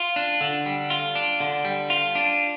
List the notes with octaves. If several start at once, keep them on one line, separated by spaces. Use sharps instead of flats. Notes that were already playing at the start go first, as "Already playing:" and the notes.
Already playing: F4
D4
D3
G3
F4
D4
D3
G3
F4
D4